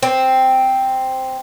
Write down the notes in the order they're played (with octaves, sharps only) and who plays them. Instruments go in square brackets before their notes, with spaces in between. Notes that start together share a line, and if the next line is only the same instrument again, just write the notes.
[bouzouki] C4